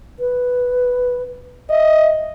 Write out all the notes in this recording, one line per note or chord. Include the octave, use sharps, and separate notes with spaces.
B4
D#5 E5